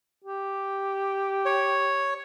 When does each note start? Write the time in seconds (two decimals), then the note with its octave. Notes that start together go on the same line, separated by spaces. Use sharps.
0.24 G4
1.46 C#5